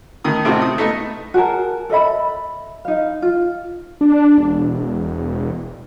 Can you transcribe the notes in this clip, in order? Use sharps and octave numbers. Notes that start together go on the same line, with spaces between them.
A2 D#3 D#6
A2 C3 C4 D#4 F4 F#4
D#6
A3 B3 D#4
F#4 G#4 A#4 A5
A4 D#5 E5 B5
D#4 F5
F4
D4
E1